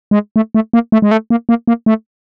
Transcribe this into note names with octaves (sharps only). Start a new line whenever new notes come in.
G#3
A3
A3
A#3
A3
G#3
A3
A#3
A#3
A#3
A3